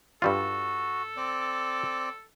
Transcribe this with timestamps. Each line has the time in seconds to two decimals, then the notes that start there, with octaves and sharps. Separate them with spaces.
0.22 G2 G3 F4 F#4 A4
1.17 C4 D5